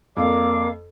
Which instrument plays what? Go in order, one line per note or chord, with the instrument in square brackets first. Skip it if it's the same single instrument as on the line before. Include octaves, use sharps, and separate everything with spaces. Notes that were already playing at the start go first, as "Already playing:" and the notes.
[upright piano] F2 [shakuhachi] A#3 [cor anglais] D5 [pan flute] F5